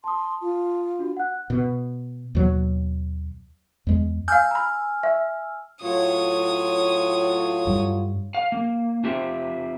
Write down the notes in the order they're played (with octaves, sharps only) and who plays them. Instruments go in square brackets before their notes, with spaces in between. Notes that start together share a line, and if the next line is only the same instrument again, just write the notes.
[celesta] A5 D#6 [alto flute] C6
[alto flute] F4
[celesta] D4 F#4
F#5 F#6
[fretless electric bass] B2
D#2 B2 F#3
E2 G#3
[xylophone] F5 G6 [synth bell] G#5 E6 F6
[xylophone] A#5 B5
E5
[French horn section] A2 F#3 F4 [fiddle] C#5 D#6
[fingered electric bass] G2
[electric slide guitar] F5
A#3
C4 F4 G4 E5